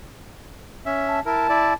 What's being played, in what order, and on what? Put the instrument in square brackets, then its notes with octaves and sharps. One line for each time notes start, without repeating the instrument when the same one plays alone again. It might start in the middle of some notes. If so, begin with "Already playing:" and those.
[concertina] C#4 E5
[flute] A5
[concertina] E4 A#4 [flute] A5
[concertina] E4 D5